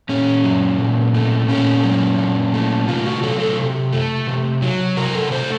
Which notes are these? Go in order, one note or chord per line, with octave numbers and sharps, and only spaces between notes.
A#2 C#4
F#3
A#2
A3
A#2 C#4
F#3
A#2
A3
C3 F4
F#4
F#3 A4
A4
C3
A3
C3
F#3
C3 A#4
A4
A3 C5